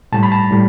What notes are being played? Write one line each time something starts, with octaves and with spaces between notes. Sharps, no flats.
A2 G3 A5
B5
A5
A2 G3